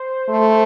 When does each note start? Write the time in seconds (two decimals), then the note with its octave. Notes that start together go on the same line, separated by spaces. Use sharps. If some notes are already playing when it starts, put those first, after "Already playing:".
Already playing: C5
0.29 A3